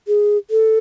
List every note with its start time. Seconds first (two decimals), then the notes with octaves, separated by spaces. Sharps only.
0.08 G#4
0.51 A4